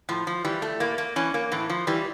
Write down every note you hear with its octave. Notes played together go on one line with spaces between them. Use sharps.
A2 F3
F3
E3 G3
A3
A2 A#3
A#3
E3 C#4
A#3
A2 E3
F3
E3 G3